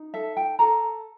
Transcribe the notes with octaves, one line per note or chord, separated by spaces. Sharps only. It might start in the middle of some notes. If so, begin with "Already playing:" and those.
Already playing: D#4
A4 E5
G5
A4 A#5